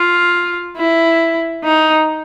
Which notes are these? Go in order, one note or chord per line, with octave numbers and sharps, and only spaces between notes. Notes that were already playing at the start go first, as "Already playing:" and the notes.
Already playing: F4
E4
D#4